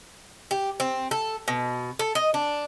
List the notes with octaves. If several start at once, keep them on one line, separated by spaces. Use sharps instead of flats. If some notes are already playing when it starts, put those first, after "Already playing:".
G4
C4
A4
B2
A4
D#5
D4